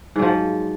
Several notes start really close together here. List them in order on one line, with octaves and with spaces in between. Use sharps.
G#2 F#3 F3